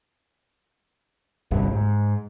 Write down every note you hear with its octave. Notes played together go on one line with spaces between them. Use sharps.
G1 C2 G2
G#2